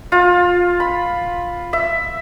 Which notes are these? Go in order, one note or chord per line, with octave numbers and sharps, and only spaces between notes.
F4
B5
E5